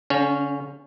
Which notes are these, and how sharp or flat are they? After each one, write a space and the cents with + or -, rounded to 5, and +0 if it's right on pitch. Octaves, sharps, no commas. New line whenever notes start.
D3 -45 C#4 +0